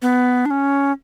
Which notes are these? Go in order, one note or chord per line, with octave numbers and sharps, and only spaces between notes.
B3
D4
C#4